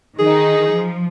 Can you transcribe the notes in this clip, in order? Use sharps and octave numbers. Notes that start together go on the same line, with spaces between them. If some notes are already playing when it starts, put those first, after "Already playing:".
D#3 D#4 G#4
F3